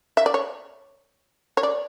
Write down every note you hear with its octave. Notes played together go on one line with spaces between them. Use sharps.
E5
D5
C#5
C#5
D5